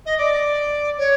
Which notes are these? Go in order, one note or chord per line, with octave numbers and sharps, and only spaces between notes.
D#5
D5
C#5